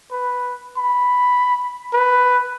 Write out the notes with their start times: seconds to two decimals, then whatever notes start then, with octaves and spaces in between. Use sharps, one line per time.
0.12 B4
0.77 B5
1.93 B4